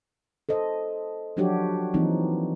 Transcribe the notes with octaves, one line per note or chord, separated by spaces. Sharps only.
A4 C5 D#5
F3 F#3 D4 F#4 G4 C#5
E3 F3 A#3 C4 D#4